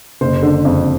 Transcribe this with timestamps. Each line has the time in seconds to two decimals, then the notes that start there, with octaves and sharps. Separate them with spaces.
0.21 F#1 C5
0.42 D3
0.65 F2